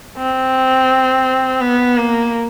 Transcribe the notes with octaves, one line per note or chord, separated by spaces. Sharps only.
C4
B3
A#3